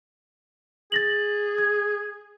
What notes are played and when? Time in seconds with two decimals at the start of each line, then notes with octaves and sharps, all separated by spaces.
0.92 G#4 A6 A#6 F#7
1.58 G#6